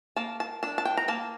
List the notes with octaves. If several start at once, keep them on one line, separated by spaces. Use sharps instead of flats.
A#3 A5
A5
D4 A5
A5
G5
A#5
A#3 A5